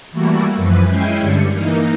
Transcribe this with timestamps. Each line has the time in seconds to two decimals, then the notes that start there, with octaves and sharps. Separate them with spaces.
0.12 E3 G3 A3 A#3 E4 F#4
0.56 F#2 E3 F3 B4
0.87 G#3 C#4 E4 G5 G#5 C7
1.19 G2 D3 G3 C#7
1.50 E3 A#3 D#4